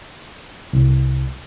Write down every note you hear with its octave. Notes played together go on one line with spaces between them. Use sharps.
C2